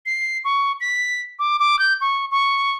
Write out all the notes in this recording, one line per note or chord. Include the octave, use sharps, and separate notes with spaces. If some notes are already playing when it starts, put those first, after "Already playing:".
C7
C#6
B6
D6
D6
G6
C#6
C#6